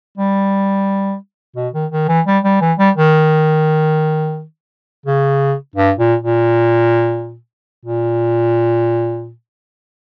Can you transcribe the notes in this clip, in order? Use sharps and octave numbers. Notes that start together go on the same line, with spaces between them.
G3
B2
D#3
D#3
E3
G3
G3
E3
G3
D#3
C#3
G2
A#2
A#2
A#2